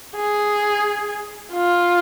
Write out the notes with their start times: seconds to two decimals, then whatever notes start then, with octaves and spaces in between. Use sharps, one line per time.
0.16 G#4
1.53 F4